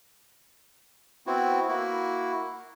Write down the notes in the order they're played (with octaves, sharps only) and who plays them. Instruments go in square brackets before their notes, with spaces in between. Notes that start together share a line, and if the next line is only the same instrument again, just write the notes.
[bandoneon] B3 C4 E4 F#4
A#3 E4 F#4